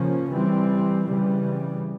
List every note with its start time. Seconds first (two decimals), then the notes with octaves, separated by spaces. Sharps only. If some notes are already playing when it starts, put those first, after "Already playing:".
Already playing: C#3 F3 A#3 C#4
0.30 E3 G3 C4
1.05 C#3 E3 G3